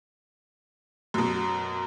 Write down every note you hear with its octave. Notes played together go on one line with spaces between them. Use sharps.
F#2 B2